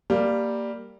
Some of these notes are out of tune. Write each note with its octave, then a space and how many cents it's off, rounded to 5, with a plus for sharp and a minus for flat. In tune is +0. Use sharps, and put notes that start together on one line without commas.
G3 +0 A#3 -10